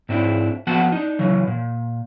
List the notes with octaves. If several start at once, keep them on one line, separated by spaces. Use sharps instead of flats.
G#2 C4 D4 E4
F3 B3 F#4 F#5 A5
D4 D#4
C#3 E3 F#3
A#2